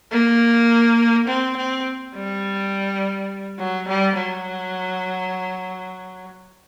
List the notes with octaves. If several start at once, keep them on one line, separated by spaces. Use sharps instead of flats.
A#3
C4
C4
G3
F#3
G3
F#3